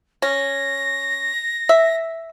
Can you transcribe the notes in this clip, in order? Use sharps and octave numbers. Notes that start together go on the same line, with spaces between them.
C#4 A#6
E5